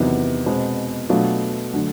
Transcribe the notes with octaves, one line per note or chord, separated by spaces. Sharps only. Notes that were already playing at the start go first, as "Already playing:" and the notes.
Already playing: E2 C3 D#3 F#3 B3
B2 G#3 C4
B2 F#3 A3 D4 F4
D3 F#3 A3